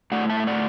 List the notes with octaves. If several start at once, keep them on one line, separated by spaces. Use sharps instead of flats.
A2 A3 D5 F#5
E5 A5
E5
D5 F#5